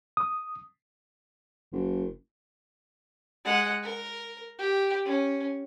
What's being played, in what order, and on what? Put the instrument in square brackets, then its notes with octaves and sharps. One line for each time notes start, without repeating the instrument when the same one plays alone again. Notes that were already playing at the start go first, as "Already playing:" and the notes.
[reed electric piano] D#6
[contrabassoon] F#1
[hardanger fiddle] G#3 F#5
A#4
G4
C#4